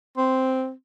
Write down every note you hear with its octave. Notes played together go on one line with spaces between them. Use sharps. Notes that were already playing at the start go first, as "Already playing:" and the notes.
C4